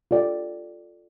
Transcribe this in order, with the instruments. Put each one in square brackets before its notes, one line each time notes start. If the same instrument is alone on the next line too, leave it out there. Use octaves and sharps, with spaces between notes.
[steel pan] F4 A4 D5 G5